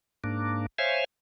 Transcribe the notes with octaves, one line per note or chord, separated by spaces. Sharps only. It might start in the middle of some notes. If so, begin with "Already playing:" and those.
G#2 A#3 D4
C5 C#5 E5 F5 G#5